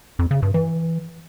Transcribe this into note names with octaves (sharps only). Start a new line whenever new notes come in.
F2
C#3
G2
E3